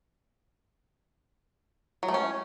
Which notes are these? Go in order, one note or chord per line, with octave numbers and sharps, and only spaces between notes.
F#3
A3
C#4